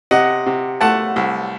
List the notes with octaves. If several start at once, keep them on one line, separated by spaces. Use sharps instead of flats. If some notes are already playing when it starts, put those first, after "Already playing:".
C3 D#5 F#5
C3
A3 F#5 A5
C2